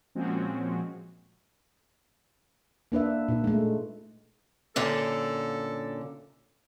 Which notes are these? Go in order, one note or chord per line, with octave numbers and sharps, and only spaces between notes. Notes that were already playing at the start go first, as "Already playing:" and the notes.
A#2 F3 G#3 C4 C#4 F#4
A#3 D4 B4 E5
A#2 D#4
G#3 A3
F#2 A#2 D3 A4